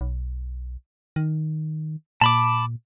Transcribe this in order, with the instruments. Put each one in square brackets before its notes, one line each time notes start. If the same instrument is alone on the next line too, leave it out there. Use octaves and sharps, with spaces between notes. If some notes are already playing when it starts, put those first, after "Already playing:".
[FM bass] B1
D#3
[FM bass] A#2 [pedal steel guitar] A5 B5 D6